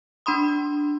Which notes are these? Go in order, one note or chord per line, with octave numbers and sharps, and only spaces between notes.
D4 B5 C6 D#6